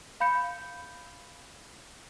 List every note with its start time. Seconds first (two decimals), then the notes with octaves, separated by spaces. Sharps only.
0.20 F5 B5 G6 C#7